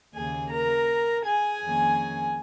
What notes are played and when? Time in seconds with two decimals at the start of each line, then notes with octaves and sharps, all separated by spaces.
0.14 D#2 C#3 A#3 G#4 G#5
0.51 A#4 A#5
1.25 G#4 G#5
1.63 F2 D#3 A#3 C#4